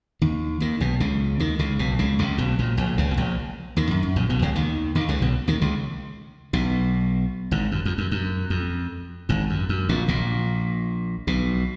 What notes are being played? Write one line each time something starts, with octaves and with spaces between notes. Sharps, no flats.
D#2 D#3
D#2 D#3
B1 B2
C#2 C#3
D#2 D#3
C#2 C#3
B1 B2
C#2 C#3
C#2 C#3
B1 B2
A#1 A#2
A#1 A#2
C#2 C#3
B2
A#1 A#2
D#2 D#3
F#2
F#2
A#1 A#2
B1 B2
C#2 C#3
D#2 D#3
D#2 D#3
C#2 C#3
B1 B2
D#2 D#3
C#2 C#3
B1 B2
G#1 G#2
F#2
F2
F#2
F#2
F2
G#1 G#2
F#2
F#2
A#1 A#2
A#1 A#2
B1 B2